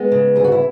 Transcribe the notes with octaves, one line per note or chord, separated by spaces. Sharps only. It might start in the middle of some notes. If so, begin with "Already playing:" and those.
Already playing: G#3 B3
C#3
D2 G#4
F#4
E4